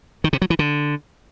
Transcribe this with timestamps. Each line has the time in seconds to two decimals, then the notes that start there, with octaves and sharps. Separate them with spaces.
0.24 D#3
0.33 C3
0.42 F#3
0.50 E3
0.59 D3